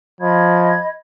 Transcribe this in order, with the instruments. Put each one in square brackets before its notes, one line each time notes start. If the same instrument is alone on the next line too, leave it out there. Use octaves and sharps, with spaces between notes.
[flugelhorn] F3 [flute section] D#5 B5 G#6